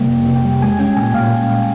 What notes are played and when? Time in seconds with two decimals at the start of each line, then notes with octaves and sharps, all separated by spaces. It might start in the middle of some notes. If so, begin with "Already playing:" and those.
Already playing: C3 G3 A#3 G5
0.10 F2
0.26 C3
0.36 G5
0.44 G3
0.62 G#3 G#5
0.79 C#4 G5
0.97 A#2 G#5
1.14 A#2 F5